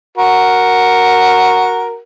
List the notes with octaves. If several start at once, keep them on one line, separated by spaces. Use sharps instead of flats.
F#4 A#4